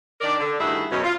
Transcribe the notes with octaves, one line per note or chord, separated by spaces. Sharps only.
D#3 D4 A#4 D5
D3
G2 D#3 A3 E4 F#4 G#4
F#2 B2 C#4
F4